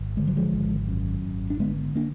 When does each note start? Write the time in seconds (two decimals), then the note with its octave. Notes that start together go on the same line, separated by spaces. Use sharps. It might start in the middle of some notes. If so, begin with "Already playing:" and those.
Already playing: G#1
0.17 D3 G#3
0.27 F#3
0.37 F3 G#3
0.53 G#1
0.88 F#2
1.25 G#1
1.50 D4
1.60 D3 G#3 B3
1.96 A#3 D4